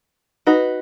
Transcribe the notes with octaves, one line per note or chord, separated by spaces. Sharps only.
D#4 F#4 B4